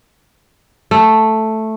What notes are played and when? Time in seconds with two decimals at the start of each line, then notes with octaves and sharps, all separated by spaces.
0.91 A3